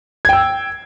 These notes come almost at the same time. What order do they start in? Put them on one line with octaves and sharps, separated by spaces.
G#6 G5 E6